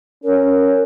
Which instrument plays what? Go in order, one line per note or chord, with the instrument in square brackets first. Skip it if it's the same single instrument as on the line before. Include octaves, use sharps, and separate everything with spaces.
[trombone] C#4 [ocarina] A#4